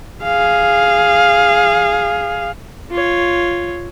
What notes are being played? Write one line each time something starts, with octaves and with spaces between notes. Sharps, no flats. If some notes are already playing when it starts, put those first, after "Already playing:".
G#4 F5
F4 C#5